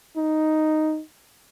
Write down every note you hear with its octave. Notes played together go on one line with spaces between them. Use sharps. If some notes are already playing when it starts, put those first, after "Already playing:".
D#4